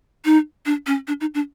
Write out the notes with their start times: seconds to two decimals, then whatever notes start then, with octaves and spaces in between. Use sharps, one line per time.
0.25 D#4
0.66 D4
0.87 C#4
1.08 D4
1.21 D#4
1.35 D4